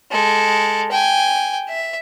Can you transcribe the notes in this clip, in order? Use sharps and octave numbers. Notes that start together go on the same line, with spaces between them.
G#3 A4
G5 G#5
E5